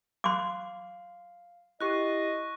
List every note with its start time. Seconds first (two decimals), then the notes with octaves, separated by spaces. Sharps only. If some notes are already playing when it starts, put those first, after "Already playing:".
0.24 F5 C6 D6
1.81 E4 G4 D#5 C#6 F#6 C7